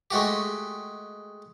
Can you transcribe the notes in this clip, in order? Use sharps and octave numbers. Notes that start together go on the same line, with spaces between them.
G#3 A3 F#4 G4